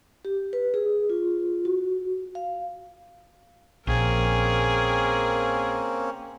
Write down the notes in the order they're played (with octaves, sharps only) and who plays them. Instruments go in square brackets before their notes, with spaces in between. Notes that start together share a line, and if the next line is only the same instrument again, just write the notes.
[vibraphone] G4
B4
G#4
F4
F#4
F5
[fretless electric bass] A#1 [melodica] A#3 C4 C#4 [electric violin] G#4 A#4